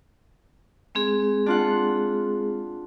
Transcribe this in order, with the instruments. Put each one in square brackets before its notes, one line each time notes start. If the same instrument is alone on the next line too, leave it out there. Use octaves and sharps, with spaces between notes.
[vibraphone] G#3 C4 G#4
[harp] D4 F4 F#5